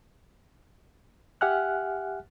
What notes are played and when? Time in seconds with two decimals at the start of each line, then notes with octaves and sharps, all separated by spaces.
1.41 G4 E5 F#5 G#5 F6 F#6